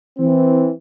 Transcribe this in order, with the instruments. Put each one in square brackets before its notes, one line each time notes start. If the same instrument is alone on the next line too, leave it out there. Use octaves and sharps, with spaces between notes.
[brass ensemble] E3 C4